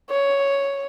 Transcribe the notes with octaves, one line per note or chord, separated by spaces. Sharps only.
C#5